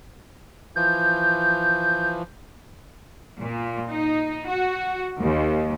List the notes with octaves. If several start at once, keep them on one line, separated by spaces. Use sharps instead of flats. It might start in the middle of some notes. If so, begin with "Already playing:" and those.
E3 F3 G6
A#2
D#4
F#4
D#2